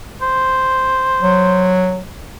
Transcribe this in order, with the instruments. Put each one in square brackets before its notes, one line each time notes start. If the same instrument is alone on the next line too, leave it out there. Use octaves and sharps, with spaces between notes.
[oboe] C5
[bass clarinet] F#3